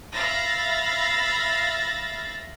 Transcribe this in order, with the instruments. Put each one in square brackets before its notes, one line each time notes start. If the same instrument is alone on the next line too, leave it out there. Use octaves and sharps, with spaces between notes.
[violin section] E5 F5 B5 A6 A#6